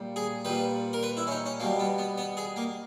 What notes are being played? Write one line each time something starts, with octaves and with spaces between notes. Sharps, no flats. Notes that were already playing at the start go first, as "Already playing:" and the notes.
Already playing: A#2 G3
G#4
A#2 G3 B4
A#4
B4
E4
C#4
D#4
C#4
B2 G3 A#3
B3
B3
B3
G#4
A#3